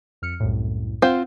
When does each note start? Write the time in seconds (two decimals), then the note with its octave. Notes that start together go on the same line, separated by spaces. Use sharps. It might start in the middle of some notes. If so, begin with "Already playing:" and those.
0.22 F2 F6 C#7
0.40 C2 F#2 A2
1.02 C4 F4 C5 F#5